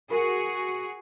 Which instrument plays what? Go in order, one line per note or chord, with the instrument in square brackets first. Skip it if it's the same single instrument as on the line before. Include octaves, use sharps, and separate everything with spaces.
[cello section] F#4 G#4 [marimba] A#4 B5